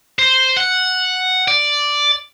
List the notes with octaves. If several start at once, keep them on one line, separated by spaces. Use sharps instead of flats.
C5
F#5
D5